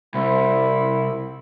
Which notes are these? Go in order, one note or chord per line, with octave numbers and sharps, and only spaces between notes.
C2 C4 E4